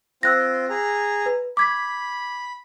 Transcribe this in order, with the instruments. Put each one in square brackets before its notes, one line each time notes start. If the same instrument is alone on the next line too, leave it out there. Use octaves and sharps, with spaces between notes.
[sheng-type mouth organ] C4 F4 [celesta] E6 F#6 A#6
[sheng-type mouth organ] G#4 A#5
[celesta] B4
[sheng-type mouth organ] B5 [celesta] D6 G#6 B6